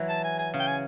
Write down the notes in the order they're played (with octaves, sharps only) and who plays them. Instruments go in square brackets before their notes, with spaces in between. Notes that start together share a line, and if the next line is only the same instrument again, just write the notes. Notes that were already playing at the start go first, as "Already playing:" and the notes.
Already playing: [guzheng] E3 F#3
[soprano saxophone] A5
G#5
G#5
[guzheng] C#3
[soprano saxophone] G5
G#5